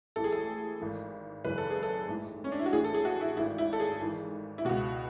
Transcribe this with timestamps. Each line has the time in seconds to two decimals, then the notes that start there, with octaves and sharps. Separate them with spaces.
0.16 A1 A2 E3 A4
0.24 G#4
0.32 A4
0.80 G#1 G#2 E3
1.44 G#1 F#2 C#3 E3 B4
1.58 A4
1.70 G#4
1.83 A4
2.08 A1 G#2 E3
2.44 C#4
2.52 D4
2.59 E4
2.66 F#4
2.73 A1 A2 E3 G#4
2.84 A4
2.94 G#4
3.05 F#4
3.21 E4
3.37 G#1 G#2 E3 E4
3.58 E4
3.73 A4
3.80 G#4
4.01 G#1 G#2 E3
4.58 E4
4.65 C#2 B2 F#4